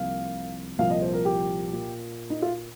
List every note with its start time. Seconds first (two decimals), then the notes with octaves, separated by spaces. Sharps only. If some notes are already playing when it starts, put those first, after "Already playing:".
Already playing: C2 C3 F3 A#3 F5
0.79 C2 A#2 F3 F5
0.90 D#5
1.02 C5
1.14 A#4
1.25 G4
1.72 A#2 A#3
2.30 D#4
2.42 F4